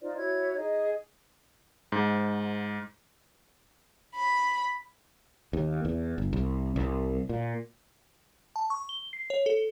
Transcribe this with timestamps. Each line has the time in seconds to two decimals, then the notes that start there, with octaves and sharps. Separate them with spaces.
0.01 D#4 F4 C5 D5
0.17 E4 F#4 C#5 G#6
0.56 D#4 G#4 D#5
1.92 G#2
4.15 B5
5.53 D#2
5.85 E2
6.18 G1
6.33 C2
6.76 C2
7.29 A#2
8.56 A5
8.70 C#6
8.89 G7
9.13 C7
9.30 C#5
9.46 A4